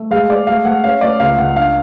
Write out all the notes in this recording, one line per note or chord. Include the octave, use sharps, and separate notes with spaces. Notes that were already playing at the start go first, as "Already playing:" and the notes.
Already playing: A3
G#3 F5
G#3 D5
A3 F5
A3 F#5
C#4 F5
A3 D5
C#2 F5
C#2 F#5
D4 F5